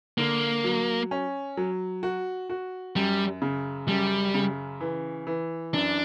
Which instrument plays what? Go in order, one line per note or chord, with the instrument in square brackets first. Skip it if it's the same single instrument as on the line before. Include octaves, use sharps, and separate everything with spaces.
[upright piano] D3 [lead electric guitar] A#3
[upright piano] F#3
C#4
F#3
F#4
F#4
[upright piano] F#2 [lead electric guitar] G3
[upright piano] C#3
[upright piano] F#2 [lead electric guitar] G3
[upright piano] C#3
E3
E3
[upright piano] F#2 [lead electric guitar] D4